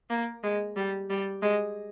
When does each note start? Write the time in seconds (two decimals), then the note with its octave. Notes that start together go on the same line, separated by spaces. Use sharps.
0.10 A#3
0.43 G#3
0.76 G3
1.10 G3
1.42 G#3